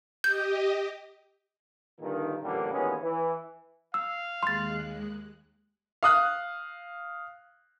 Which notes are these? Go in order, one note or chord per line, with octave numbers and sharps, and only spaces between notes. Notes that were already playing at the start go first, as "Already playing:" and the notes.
G4 D#5 G6
G2 A#2 D3 D#3
A1 F#2 A#2 D3 G3 A#3
D#2 A#2 E3 G#3 B3 C#4
E3
F5 E6
D#2 G#3 C6 F#6 A6
F5 D#6 F#6